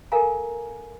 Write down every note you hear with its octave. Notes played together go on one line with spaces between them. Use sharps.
A4 A#4 F5 G#5 A#5